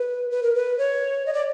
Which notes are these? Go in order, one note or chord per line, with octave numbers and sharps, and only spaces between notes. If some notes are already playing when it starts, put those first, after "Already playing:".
Already playing: B4
B4
A#4
B4
C#5
D#5
D5